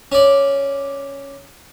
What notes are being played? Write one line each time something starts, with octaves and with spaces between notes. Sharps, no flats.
C#4 D5